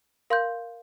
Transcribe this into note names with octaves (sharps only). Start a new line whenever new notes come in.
A#4 F5 C6 G6